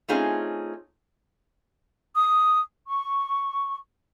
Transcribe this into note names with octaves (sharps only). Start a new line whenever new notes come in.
A3 C4 C#4 D#4 F4 G#4
D#6
C#6